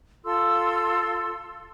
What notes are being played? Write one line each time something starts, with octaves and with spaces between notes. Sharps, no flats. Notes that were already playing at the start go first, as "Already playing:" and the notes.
F4 A4 C6 E6